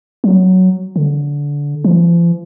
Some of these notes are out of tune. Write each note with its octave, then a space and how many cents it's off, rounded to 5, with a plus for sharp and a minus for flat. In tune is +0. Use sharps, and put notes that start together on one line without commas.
F#3 +5
D3 -20
F3 -40